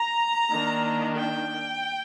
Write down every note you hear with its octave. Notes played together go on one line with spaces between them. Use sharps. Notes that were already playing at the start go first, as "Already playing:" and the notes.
Already playing: A#5
D#3 A#3 D4
G5